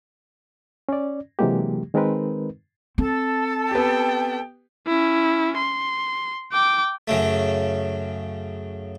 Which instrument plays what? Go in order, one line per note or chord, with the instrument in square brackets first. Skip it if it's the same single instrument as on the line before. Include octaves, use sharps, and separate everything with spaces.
[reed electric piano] C#4 D5
C3 E3 F#3 G#3 A#3 G4
D#3 G#3 C4 D#4 A#4 B4
[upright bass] C4 [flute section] A4 A5
[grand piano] B3 G4 [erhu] G5
[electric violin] C#4 E4
C6
G5 D6
[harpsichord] F#2 C#3 A3